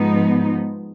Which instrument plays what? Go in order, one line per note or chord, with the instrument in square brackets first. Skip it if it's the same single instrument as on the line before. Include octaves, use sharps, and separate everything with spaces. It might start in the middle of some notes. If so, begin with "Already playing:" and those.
Already playing: [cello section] G#2 F3 G#3 B3 D#4